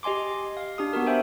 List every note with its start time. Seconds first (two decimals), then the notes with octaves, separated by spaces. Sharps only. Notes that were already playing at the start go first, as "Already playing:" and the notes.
0.03 G4 D#5 G#5 C6 D6
0.57 F5
0.78 D4 G4 D#6
0.93 B3 F#4 A#4
1.07 C5 E5 G5 G#5